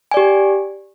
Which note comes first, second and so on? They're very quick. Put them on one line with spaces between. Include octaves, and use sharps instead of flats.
G#5 D5 G4